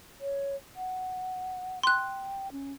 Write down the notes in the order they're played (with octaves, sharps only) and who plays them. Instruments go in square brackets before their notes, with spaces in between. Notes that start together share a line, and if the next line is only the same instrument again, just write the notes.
[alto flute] C#5
F#5
[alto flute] G5 [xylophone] C6 F#6
[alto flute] C#4